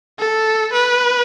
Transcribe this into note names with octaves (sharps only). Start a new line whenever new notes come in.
A4
B4